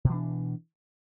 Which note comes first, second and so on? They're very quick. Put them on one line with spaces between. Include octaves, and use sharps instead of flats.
B2 E3 D4